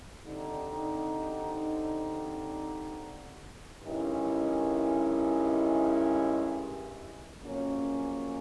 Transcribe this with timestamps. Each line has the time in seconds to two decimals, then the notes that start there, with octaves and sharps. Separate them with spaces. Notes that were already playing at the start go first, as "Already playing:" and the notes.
0.25 D3 G3 C4 D#4
3.84 G2 D#3 G#3 C#4 E4
7.42 F2 C#3 F#3 A#3 C#4